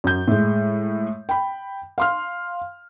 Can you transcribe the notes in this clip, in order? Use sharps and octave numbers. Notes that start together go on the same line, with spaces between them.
F#2 G6
A2 G#3
G5 B5
F5 C6 F6